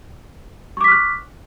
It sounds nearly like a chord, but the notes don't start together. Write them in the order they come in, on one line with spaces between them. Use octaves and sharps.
C#6 D6 B6 F6 F#6